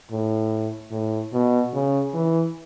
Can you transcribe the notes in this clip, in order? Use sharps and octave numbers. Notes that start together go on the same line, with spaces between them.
A2
A2
B2
C#3
E3